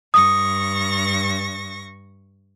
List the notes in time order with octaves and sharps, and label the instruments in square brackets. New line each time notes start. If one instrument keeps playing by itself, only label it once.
[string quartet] G2 C#6 A#6 [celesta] D#6